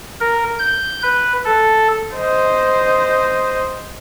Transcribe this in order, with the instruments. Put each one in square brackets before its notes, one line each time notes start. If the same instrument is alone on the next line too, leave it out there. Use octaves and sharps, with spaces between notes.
[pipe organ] A#4
G6
B4
A4
[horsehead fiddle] C5 D#5